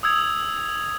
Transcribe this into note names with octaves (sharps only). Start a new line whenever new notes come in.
D#6 E6 G#6 F7